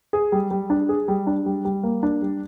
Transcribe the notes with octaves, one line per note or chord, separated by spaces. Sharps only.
G#4
G3
G3
D4
G#4
G3
D4
G3
G3
A#3
D4
G3